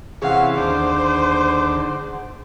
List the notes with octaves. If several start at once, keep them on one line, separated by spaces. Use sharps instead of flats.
C3 E3 C#4 G#4 F5 F#5
D#2 D3 D4 C5